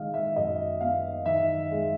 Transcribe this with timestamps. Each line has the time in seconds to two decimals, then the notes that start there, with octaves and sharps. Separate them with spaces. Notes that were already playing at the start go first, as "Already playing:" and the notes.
Already playing: D#3 G#3 D#5 F5
0.14 E5
0.36 F#2 D#5
0.81 B3 F5
1.25 D#3 E5
1.71 G#3